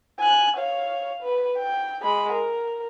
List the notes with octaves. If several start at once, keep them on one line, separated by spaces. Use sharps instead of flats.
G#5 F#6
C#5 F5
B4
G5
G#3 B5
A#4